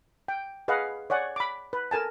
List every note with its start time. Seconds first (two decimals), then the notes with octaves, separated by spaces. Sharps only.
0.28 G5
0.68 G#4 B4 D#5 F5 F#5
1.10 C#5 D5 F#5 G#5
1.36 B5 D6
1.73 B4
1.91 A4 A#4 G#5 A5